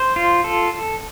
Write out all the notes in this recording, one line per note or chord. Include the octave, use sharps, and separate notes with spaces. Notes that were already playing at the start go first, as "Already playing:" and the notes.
Already playing: C5
F4
A4